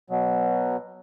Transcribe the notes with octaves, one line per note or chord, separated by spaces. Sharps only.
B2 F#3